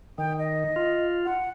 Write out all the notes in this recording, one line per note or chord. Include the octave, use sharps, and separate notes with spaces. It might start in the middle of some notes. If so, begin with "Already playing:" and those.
D#3 G5
D#5
F4
F#5